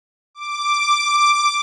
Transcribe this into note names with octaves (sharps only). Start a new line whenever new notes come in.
D6